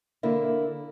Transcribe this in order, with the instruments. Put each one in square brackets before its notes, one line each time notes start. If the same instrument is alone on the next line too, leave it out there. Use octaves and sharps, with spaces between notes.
[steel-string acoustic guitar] D3 A#3 E4